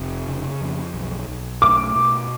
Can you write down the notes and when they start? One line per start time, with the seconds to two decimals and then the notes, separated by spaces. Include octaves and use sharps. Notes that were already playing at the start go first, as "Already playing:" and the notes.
Already playing: F1
0.27 C#3
0.61 F2
0.94 B1
1.28 B1
1.62 A3 D6
1.96 B2